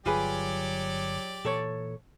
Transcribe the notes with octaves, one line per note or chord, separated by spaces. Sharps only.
G1 F#3 F4 G4 G#4 B4 D5
A#2 E3 A4 C#5